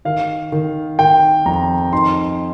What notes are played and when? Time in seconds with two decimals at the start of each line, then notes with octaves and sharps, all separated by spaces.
0.05 D#3 F5
0.52 D#3
0.99 D#3 G5
1.46 F2 A#5
1.93 D#4 C6